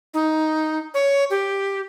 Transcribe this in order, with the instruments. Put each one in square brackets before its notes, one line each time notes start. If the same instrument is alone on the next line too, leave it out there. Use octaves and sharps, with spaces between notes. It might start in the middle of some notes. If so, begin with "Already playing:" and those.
[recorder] D#4
C#5
G4